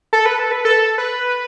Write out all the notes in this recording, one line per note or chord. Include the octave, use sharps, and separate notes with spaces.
A4
B4
A4
B4
A4
B4